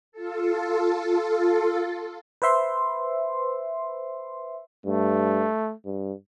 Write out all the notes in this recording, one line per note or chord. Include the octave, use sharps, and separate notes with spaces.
F4 A4
B4 C5 E5 C6
G2 A3
G2